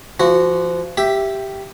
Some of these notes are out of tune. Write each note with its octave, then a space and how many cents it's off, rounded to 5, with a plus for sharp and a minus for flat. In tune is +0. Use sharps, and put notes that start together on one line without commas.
F3 -25 F#4 +0
G4 +0 E5 +10